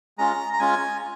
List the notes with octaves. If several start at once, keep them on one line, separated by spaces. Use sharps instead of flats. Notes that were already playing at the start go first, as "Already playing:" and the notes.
G#3 C#4 F4 A#5
A#5
G#3 C#4 F4 G#5